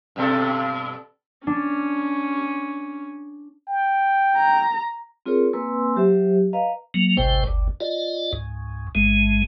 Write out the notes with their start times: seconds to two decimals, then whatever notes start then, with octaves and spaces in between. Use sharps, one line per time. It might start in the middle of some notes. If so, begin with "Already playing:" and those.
0.16 G2 B2 A4
1.47 C#4 D4
3.68 G5
4.37 A#5
5.26 C4 F4 G#4 A#4 C#5
5.53 A#3 C4 B4 G#5 C6 E6
5.96 F#3 G4 C5 E5
6.53 B4 D#5 F5 A#5
6.94 F#3 A#3
7.17 G#1 C#2 A2 C3 C5 G5
7.47 G1 D2
7.80 F4 D5 D#5
8.33 C#2 G#2
8.95 A1 G#2 G#3